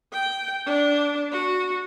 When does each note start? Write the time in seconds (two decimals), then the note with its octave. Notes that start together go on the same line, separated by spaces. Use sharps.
0.13 G5
0.66 D4
1.32 F#4